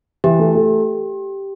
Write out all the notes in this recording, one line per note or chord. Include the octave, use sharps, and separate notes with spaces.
E3 G4
A3
A3